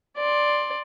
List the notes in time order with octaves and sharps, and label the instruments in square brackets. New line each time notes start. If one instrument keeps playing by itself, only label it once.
[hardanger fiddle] D5 C6